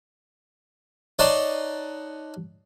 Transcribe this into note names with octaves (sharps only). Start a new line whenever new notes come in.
D#4 C#5 D5 F#5 A5 C6